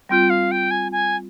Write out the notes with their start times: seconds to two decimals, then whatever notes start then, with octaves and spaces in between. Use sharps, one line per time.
0.09 G3 C4 F4 G5
0.30 F5
0.51 G5
0.71 G#5
0.92 G#5